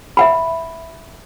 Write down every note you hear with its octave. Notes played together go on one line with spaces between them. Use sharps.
E5 F#5 B5